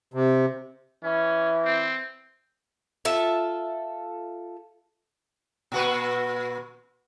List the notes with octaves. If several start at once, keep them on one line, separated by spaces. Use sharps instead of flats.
C3
E3 C#4
C4
F4 A4 E5
A#2 F#4 B4